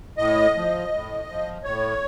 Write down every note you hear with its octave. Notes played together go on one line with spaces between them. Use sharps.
A2 D#5
F3
A2
F3
A2 C#5